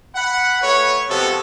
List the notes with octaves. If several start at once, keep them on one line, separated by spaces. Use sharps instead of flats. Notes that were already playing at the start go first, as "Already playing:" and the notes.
F#5 B5
A3 F#4 B4 C#5
C3 F3 G#3 B3 F#4 A4